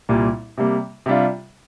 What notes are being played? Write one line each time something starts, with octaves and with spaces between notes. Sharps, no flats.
C2 A#2 G3 A#3
C3 G3 A#3
C3 G3 D4 F4